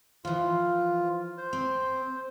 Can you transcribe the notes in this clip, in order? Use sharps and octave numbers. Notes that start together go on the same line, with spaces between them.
E3 F3 F4
C5
C4